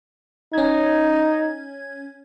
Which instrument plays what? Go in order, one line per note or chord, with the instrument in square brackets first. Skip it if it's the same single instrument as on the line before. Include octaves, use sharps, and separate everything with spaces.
[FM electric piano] C#4 G#6 [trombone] D#4